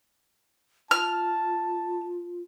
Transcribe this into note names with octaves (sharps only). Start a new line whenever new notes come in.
F4 A5 F6